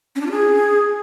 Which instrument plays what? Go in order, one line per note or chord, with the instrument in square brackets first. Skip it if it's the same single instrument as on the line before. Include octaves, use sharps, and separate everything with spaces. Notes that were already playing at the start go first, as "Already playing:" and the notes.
[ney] C#4
D4
F4
G#4